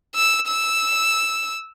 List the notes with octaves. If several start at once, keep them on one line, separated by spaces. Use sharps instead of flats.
E6
E6